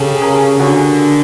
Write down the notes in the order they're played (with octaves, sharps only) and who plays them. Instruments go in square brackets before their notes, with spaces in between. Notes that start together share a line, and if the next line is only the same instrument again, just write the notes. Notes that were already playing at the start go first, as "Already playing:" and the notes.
Already playing: [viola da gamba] C#3 [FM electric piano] G4 A4
[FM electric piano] G#4 A#4
[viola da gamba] D3 [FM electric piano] F#4 G#4